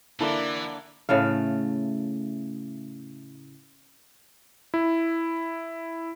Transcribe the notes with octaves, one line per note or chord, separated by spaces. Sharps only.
D3 E3 A#3 E4 A4 D5
A2 C#3 A3 F5
E4